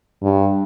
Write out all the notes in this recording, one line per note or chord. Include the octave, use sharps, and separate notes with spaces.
G2